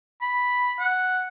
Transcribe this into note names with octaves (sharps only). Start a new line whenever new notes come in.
B5
F#5